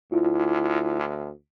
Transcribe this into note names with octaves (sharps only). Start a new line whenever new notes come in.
D2 E4 F4